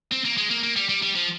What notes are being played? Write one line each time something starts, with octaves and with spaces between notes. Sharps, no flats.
C4
A#3
G#3
A#3
A#3
G3
G3
G3
F3